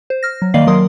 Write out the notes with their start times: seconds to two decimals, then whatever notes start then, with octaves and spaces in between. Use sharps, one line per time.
0.10 C5
0.23 F6 A#6
0.42 F#3
0.54 D#3 A#3 D5 D#5 F5 C7
0.67 F#3 A#4 C6 D#6